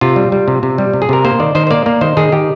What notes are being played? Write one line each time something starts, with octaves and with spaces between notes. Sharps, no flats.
C3 F4
G3
G3
C3
C3
G3
C3
G#4
C3 A#4
A#3 C5
D#3 D5
D#3 C5
C5
A#3 D5
A#3 D5
D#3 C5
D#3 G#4
D#3 G4